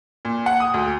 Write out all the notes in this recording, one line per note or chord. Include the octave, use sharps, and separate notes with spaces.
A#2
F#5
D#6
D2